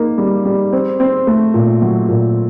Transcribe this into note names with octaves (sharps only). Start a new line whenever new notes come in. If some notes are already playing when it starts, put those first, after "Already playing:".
Already playing: A#3 D#4
G3
G3
C4
C4
A3
A#2
F#3
A#2